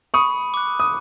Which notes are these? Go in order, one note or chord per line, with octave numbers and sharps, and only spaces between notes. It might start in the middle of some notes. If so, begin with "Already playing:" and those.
B5 C#6 D#6
D6 F#6
D#6